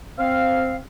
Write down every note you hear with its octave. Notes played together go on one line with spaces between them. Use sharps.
C4 F5